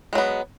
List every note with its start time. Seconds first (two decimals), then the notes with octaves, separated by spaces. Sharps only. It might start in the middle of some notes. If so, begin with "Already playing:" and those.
0.13 G#3
0.15 F#3
0.18 B3